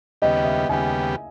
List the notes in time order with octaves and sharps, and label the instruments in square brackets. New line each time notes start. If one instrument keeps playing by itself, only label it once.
[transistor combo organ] D#2 C#3 G3 B3 G4 [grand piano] D#5
[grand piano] E5
[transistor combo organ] D#2 C#3 G3 B3 G4 [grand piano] G#5